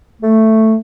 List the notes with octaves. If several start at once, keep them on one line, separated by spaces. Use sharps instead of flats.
A3